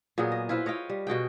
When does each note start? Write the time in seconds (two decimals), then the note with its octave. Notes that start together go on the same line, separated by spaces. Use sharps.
0.18 A#2 F#3 B3 G#4
0.32 D#5
0.49 E4 F4 B4 C5
0.66 C#5 D#5 F5 G5
0.90 G3
1.07 B2 F#4 G#4 G5